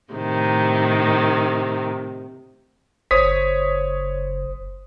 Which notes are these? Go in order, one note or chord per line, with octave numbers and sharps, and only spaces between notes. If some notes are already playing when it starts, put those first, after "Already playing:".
A2 C3 D#3
F#1 C5 C#5 D#6 B6